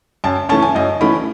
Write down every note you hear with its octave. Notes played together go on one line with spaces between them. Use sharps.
F#2 A5
E3 A3 C#4 A5
G#5
F#2 D#5
E3 A3 C#4 B5